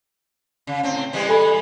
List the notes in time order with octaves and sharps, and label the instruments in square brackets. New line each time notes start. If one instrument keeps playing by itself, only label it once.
[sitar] C#3
A2 C4
E3 G3 G#3
[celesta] A4 G#5 B5